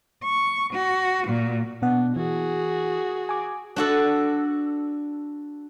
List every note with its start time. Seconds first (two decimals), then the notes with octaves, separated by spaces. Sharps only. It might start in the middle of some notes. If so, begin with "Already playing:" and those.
0.24 C#6
0.74 F#4
1.27 A#2
1.82 B2 B3 D4 F#5
2.16 E3 F#4 G#4
3.29 G#5 D6
3.76 D4 F#4 A4